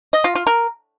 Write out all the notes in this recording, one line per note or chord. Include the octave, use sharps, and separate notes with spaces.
D#5
F4
F4
A#4